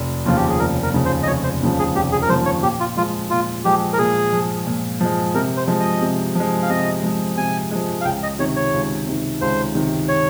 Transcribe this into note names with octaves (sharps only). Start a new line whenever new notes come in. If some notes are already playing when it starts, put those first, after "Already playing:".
Already playing: F1
D#2 C#3 F3 F4
G4
G#4
F1 A#4
A#4
D#2 C#3 F3
C5
D#5
F1 C#5
C5
D#2 C#3 F3
G#4
F1 G4
G#4
A#4
D#2 C#3 F3 C5
C#5
A#2 G4
F4
F3 G#3 F4
A#2 F4
F3 G#3 G4
A#4
A#2 G#4
F3 G#3
A#2
F3 G#3
C3 A#4
C5
F3 G#3
D#5
C3
F3 G#3
F5
C3 D#5
F3 G#3
C3 G#5
F3 G#3
F5
C#2 G5
D#5
C3 D#3 C#5
C#5
C#2
C3 D#3
C#2 C5
C3 D#3
C#5